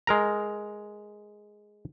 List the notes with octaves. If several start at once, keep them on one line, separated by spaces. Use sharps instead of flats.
G#3 A#4 A#5